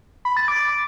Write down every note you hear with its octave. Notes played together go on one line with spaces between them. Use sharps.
B5
A6
D6